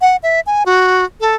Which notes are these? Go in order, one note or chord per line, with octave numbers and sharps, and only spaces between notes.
F#5
E5
G#5
F#4
A4